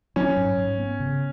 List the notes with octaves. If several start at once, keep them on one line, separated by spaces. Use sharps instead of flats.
F#3 C#4
G#2
G#2
B3
C#3